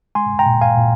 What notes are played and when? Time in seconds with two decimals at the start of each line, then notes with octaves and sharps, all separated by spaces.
0.15 G#3 G#5 C6
0.39 G5 A#5
0.46 A#2
0.61 F5 G#5
0.77 A#2